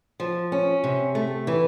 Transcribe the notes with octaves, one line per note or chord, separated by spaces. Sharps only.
F3
C#4
C3
A3
E3